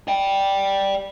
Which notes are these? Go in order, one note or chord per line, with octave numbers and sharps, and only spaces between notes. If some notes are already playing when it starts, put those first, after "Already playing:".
D5 G5